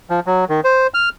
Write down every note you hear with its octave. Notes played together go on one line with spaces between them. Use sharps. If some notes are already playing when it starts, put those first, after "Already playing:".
F3
F#3
D#3
C5
F6